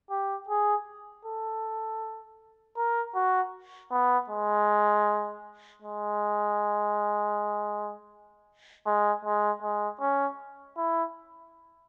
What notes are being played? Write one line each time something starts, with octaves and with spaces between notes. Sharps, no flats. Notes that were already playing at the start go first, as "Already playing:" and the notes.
G4
G#4
A4
A#4
F#4
B3
G#3
G#3
G#3
G#3
G#3
C#4
E4